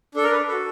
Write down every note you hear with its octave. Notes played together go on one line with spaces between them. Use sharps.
D4 A4
A#4
B4
F#4 A4 B4